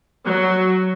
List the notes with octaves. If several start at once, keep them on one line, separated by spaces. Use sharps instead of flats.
F#3